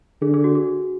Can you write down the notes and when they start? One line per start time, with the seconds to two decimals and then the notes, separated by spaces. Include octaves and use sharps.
0.22 D3 G#4
0.34 G#4
0.44 F#4
0.55 G#4